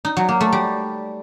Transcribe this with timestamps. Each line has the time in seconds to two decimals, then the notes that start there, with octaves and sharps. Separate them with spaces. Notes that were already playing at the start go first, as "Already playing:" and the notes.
0.05 D#4
0.17 F#3
0.29 A#3
0.41 A3
0.52 G3